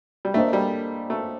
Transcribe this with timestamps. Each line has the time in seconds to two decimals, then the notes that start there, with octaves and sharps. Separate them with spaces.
0.25 G3
0.34 A3 A#3 D4 A4 C5 D#5
0.53 G3
1.10 A3